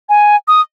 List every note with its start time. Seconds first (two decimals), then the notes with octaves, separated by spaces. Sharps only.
0.09 G#5
0.48 D#6